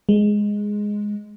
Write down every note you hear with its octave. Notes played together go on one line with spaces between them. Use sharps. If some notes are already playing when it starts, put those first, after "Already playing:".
G#3